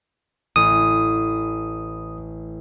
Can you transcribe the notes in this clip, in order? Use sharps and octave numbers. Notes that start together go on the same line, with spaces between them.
A1 D#6